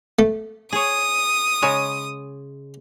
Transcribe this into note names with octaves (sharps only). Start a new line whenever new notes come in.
A3
G#4 C#5 D#6
C#3 G#3 C#5